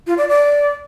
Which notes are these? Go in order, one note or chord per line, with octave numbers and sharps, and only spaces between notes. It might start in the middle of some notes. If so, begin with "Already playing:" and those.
F4
D5
D5